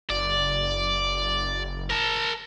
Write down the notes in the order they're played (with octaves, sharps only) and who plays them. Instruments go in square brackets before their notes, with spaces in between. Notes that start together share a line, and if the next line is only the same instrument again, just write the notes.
[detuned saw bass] F#1 [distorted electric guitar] D5
[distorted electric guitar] A#4 A5